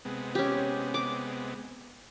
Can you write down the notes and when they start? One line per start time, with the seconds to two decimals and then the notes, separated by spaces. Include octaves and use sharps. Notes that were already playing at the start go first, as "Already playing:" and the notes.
0.05 C3 G#3 B3
0.35 C#4 G4
0.94 D6